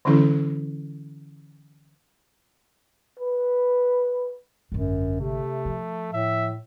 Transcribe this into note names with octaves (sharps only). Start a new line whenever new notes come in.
D3 E3 F#3 C#4 E4 A4
B4
G#1 F#2 D3
C3 A3
F3
A2 E5